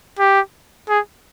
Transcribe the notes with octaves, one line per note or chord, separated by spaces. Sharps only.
G4
G#4